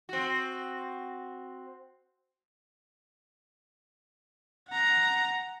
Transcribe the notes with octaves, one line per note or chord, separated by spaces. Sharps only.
C4 F#4
F#5 A#5